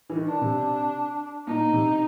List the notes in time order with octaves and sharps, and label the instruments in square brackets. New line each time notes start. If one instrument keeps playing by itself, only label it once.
[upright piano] E3
D#3
[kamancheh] D4
[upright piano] C3
[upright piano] A#2 [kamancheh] D#4
[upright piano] C3